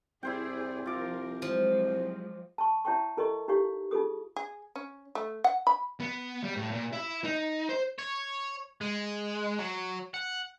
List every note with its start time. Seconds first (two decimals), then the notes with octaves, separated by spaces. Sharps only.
0.23 C2 E4 G#4 C5 D5 G5
0.86 F3 F4 A#4 D6
1.42 F3 F#3 G#3
2.58 A5 C#6
2.85 E4 C#5 E5 G5 A5 C#6
3.17 E4 A4 A#4 D#5 C#6
3.48 D#4 E4 G4 C#5 F5 C#6
3.91 D#4 F4 G#4 A4 D#6
4.36 G#4
4.76 C#4
5.15 A3
5.44 F#5
5.67 B5
6.00 B3
6.43 G3
6.56 A2
6.72 A#2
6.93 E4
7.24 D#4
7.69 C5
7.98 C#5
8.81 G#3
9.59 F#3
10.14 F#5